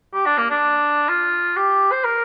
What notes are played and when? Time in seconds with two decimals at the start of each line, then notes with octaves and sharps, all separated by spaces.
0.14 G4
0.26 D4
0.38 A#3
0.51 D4
1.09 F4
1.57 G4
1.92 C5
2.04 A#4